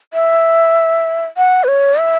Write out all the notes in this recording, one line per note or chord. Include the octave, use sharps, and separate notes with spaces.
E5
F#5
B4
C#5
E5